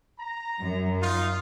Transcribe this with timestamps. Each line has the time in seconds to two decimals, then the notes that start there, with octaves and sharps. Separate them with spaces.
0.19 A#5
0.60 F#2
1.02 D#4 F4